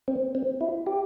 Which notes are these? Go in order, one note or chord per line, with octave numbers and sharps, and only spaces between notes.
C4
C4
E4
G4